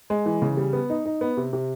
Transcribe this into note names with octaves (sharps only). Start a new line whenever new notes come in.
G#3
E3
C#3
G3
B3
D#4
D#4
B3
C3
C3